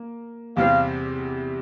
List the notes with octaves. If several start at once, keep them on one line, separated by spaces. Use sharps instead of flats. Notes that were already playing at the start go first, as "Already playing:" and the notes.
Already playing: A#3
E2 C3 G3 C4 F5